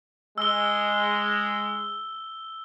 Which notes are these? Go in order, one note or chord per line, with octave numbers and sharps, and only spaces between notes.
G#3 E6 G7